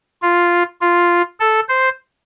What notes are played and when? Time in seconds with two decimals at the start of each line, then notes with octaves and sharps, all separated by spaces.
0.22 F4
0.81 F4
1.40 A4
1.69 C5